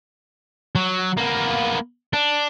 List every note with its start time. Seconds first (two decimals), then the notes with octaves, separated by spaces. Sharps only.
0.75 F#3
1.17 A#3 B3
2.13 D4